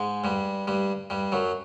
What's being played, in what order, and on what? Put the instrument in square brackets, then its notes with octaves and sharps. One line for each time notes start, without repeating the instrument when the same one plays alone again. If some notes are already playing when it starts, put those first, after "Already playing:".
Already playing: [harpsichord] G#2 G#3
G2 G3
G2 G3
G2 G3
F#2 F#3